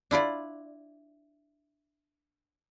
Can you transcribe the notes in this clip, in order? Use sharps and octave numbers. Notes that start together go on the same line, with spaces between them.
D4 E4 F4 D5